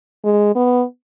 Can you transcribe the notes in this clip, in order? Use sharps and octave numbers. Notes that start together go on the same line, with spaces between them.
G#3
B3